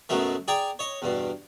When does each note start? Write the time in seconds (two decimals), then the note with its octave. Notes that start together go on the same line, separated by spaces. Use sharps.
0.09 F#2 B2 F#3 G#3 A3
0.48 G#4 D5 G5 G#5 A#5
0.79 C#5 D#5
1.02 E2 G2 B2